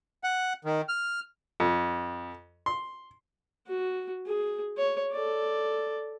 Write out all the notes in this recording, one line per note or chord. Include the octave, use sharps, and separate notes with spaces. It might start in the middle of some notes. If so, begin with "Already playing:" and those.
F#5
D#3
F6
F2
C6
F#4
G#4
C#5
A4 D5